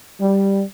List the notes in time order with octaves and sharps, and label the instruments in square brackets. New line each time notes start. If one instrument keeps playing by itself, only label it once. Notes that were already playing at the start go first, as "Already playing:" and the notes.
[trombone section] G3